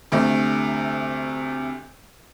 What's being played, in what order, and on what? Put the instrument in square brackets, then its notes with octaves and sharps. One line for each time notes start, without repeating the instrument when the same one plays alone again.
[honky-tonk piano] D2 C3 A3